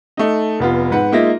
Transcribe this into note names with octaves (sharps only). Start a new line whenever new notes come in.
A3 D#4
F1 B3 F4
G#2 B4 F#5
G#3 A#3 D#4 F4 E5 A#6